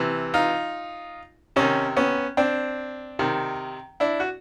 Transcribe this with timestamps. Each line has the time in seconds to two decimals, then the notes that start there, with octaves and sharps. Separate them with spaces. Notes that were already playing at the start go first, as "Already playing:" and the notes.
Already playing: C3 E3
0.34 D#4 F4
1.56 C3 D#3 C#4 D#4
1.96 B3 C#4
2.37 C4 D4
3.19 C3 D#3
4.00 D4 E4
4.20 F#4